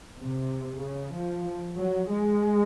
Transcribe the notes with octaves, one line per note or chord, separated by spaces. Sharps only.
C3
C#3
F3
F#3
G#3